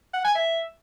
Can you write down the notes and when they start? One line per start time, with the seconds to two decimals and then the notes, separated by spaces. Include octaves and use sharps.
0.14 F#5
0.24 G#5
0.35 E5